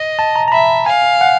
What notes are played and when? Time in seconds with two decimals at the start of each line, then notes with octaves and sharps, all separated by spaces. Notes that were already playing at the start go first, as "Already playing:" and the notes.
Already playing: D#5
0.19 A5
0.36 A#5
0.48 A#5
0.52 E5 B5
0.86 F5 G#5
1.21 F#5